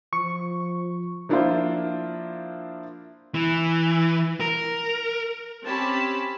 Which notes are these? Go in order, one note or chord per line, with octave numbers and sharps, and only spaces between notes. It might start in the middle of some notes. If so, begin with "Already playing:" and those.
F3 C#6
F3 A#3 D4 E4 F4 C5
E3
A#4
C4 C#4 G4 A5 B5